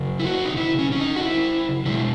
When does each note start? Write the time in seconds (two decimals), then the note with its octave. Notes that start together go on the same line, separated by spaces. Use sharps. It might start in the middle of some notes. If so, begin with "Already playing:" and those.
Already playing: C#3 F#3
0.20 E4
0.25 F#4
0.45 D#4
0.57 E4
0.79 C#4
0.92 C#4
1.00 D#4
1.16 F#4
1.21 E4
1.86 B2 G#3 E4